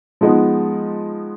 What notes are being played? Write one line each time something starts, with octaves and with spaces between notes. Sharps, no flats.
F3 G#3 B3 D#4